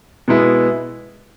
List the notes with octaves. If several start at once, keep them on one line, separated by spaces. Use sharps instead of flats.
B2 G#3 B3 E4